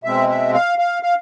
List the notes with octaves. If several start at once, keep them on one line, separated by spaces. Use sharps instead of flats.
B2 G#3 C4 E5
E5
F5
F5
F5